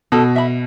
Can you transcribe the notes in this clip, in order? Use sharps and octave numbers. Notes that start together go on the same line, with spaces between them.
B2 A4
E5 B5